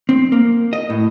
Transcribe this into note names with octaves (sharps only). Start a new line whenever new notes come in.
C4
A#3
D#5
A2